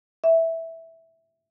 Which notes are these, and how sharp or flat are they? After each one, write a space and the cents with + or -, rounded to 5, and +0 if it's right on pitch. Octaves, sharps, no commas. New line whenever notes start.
E5 -5